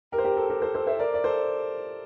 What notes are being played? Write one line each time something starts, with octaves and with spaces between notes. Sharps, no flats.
G4 A#4
C5
G4 A#4
A4
G4 A#4
A4 C5
A4 C5
C5 E5
A#4 D5
D5
A4 C5